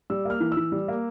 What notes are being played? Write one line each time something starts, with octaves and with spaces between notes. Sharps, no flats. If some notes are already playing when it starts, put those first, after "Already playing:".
G3 E6
A#3 F6
E3
E6
E3
G3
A#3